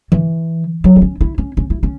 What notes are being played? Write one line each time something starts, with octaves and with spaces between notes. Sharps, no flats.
E3
F#3
B3
C#4
E4
C#4
C#4
E4
C#4